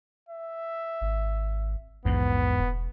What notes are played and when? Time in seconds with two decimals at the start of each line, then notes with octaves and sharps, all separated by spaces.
0.29 E5
1.01 G#1
2.05 A#1 E2 G#2 B3
2.58 E1